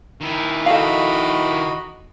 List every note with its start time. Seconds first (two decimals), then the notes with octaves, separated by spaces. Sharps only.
0.21 D#3 E4
0.66 F#4 A4 D#5 F5 B5